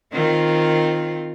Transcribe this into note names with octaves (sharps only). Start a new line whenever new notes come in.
D#3 C4 F4